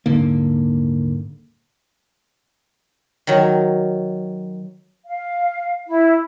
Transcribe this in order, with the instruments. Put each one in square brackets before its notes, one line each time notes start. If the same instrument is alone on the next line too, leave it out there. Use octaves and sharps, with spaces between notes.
[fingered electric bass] D#1 G#2 D3 A#3
[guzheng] D#3 F#3
[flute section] F5
E4